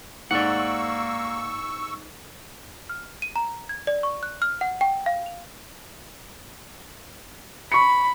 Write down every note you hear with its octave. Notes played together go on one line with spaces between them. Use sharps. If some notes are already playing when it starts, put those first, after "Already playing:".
G#2 A#3 D5 F#5 C#6 E6
F6
D#7
A#5
G#6
D5
C#6
F#6
F6
F#5
G5
F5
F7
B5 C#6 C#7